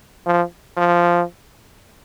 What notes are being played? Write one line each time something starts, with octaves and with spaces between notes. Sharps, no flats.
F3
F3